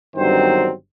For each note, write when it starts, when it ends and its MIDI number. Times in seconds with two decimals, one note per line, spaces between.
0.17 0.71 31
0.17 0.71 43
0.17 0.71 51
0.17 0.71 54
0.17 0.71 60
0.17 0.71 72